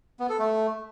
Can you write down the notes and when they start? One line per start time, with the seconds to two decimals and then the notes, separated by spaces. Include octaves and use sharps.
0.20 B3
0.29 A4
0.39 A3